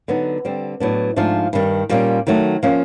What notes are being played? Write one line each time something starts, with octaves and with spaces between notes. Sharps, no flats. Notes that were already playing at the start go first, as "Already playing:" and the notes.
D3 F#3 B3 D#4
D3 G3 C4
A2 F#3 B3 D4
G#2 F3 A3 D4 F4
G2 D#3 G3
A#2 G3 A#3 C#4
D#3 F#3 A3
F3 A#3 C#4